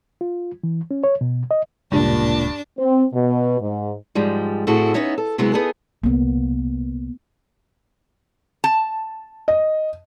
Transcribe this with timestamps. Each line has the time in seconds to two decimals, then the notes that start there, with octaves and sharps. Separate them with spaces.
0.21 F4
0.64 E3
0.91 C#4
1.04 C#5
1.21 B2
1.51 D#5
1.92 D1 G2 A#2 C#3 G#3 D4 A5
2.79 C4
3.14 B2
3.60 G#2
4.15 G#2 F3 G3 G#3
4.67 A2 C4 E4 F#4 G#4 A4
4.94 B3 C#4 D#4 C#5 E5
5.18 A4
5.38 C3 F#3 G#3 B3 E4
5.53 B3 D#4 G#4 A4
6.04 C2 A#3 B3
8.64 A5
9.48 D#5